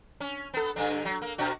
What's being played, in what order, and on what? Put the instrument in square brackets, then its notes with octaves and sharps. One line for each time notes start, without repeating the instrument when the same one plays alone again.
[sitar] C#4
B3 A4
G2 D3 D4
F#3
A#3
B2 D4 F#4